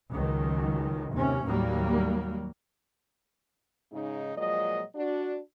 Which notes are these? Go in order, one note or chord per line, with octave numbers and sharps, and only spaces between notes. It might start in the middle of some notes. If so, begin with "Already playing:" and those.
C#2 D#3 F#3
D#2 C3 C#4
D#2 A2 F#3 G3 A#3
G#2 C#3 D#4
A#2 F3 F#3 G#3 D#5
D4 F#4